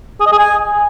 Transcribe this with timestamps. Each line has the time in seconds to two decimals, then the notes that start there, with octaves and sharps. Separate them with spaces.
0.20 G#4
0.26 D#5
0.32 G#4
0.38 G#5